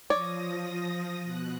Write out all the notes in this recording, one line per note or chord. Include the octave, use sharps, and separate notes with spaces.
F3 C#5 D5 D#6 A#6
B2 F#6